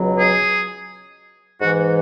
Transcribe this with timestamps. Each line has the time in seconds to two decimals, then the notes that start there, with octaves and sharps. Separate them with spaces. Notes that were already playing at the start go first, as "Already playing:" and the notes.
Already playing: C#2 B2 F#3
0.18 G#4
1.60 G#2 E3 F#4